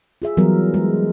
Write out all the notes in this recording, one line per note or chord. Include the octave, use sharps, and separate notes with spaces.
F4 G#4 E5
E3 F#3 G3 B3 A#4
G#3